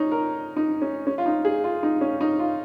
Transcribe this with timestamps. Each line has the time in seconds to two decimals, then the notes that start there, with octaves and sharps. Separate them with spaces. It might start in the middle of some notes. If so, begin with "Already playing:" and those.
Already playing: C#4 D#4
0.12 A#4
0.57 D#4
0.82 C#4
1.07 C#4
1.18 F4
1.26 D#4
1.45 G#4
1.64 F4
1.83 D#4
2.01 C#4
2.21 D#4
2.39 F4